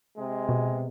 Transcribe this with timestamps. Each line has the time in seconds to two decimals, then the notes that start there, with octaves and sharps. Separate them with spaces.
0.17 C3 G#3
0.49 B2